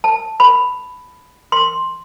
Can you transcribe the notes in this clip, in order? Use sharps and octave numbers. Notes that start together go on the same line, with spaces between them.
A5
B5
C6